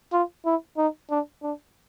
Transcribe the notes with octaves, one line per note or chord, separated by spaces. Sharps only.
F4
E4
D#4
D4
D4